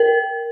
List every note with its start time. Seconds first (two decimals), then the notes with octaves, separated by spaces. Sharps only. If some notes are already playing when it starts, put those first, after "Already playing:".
Already playing: A#4